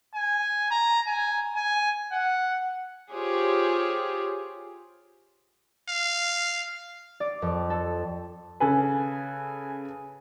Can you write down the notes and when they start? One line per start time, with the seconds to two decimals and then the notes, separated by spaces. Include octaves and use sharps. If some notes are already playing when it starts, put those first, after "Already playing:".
0.14 G#5
0.71 A#5
1.07 G#5
1.55 G#5
2.12 F#5
3.11 F4 G4 G#4 C5 C#5
5.88 F5
7.20 D5
7.42 F2
7.70 A4
8.60 C#3 A4 B4 G#5